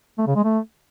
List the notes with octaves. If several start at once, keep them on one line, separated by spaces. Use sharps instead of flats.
A3
C#3
G#3
A3